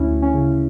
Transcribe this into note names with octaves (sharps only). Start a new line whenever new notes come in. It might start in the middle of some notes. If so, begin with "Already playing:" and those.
Already playing: D2 C#4 E4
D2
C#4
C#3